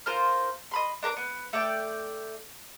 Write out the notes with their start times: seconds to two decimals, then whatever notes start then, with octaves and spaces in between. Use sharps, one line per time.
0.06 F4 A#4 C5 F6
0.71 D#5 B5 C6
1.03 D4 A#4 A#5 D6
1.17 B3
1.53 A3 D5 G5